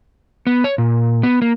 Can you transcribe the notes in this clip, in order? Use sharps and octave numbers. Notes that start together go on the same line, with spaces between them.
B3
C#5
A#2
B3
A#3